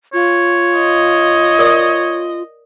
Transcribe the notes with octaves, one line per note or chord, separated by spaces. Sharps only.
F4 C#5
D#5
A#4 D5 D#6